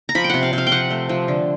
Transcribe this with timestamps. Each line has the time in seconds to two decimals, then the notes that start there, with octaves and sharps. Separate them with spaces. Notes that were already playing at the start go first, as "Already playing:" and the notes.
0.09 A#5
0.15 F3 B5
0.24 G5
0.30 C3 F#5
0.43 F5
0.53 C3
0.58 F5
0.67 G5
0.72 F3 F#5
0.90 A3
1.09 F3
1.28 D3